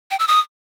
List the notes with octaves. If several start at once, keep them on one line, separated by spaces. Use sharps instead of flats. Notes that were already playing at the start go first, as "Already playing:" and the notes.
G5
E6
D#6